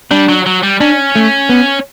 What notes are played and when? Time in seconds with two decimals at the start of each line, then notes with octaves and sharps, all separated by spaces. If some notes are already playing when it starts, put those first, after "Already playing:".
0.11 G3 D4
0.29 F#3
0.46 F#3
0.63 G3
0.80 C#4 D4
1.16 A3
1.49 B3